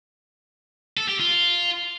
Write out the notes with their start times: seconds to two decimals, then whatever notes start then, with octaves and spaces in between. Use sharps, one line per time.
0.97 A4
1.08 G4
1.20 F4